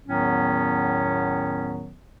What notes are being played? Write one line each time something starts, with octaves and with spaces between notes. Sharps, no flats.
E2 A2 D#3 F#3 B3 C#4